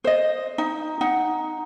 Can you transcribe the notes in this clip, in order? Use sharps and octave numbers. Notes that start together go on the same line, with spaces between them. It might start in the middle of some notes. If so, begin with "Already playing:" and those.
C5 D#5
D#4
D#4 F#5